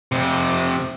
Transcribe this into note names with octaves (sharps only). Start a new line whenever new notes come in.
F2 C3